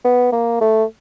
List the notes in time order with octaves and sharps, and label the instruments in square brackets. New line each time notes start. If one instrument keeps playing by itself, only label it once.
[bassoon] B3
A#3
A3